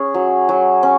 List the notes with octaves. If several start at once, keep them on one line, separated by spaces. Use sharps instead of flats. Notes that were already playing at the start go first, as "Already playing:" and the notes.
Already playing: C#4 G#4
F#3
F#3
C#4